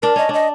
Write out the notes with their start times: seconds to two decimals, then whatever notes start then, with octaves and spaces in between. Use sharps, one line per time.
0.02 D4 A#4
0.16 C#4 D#5
0.29 D4 D#5